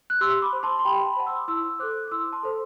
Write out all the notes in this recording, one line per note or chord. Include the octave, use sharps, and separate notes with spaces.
F#6
G4 C6 E6
B5 D6
C5
A5 C6
C6
G4 G5 B5
A5
B5
C5 F#5 A5
C6 E6
D6
E4 C6 E6
E6
A4 C5 D6 F#6
D6
E4 C6 E6
A5 C6
A4 C5